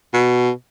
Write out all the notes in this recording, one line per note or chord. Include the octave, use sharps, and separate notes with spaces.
B2